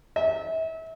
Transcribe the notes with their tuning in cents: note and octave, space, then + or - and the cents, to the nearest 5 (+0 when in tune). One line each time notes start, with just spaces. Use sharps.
E5 -30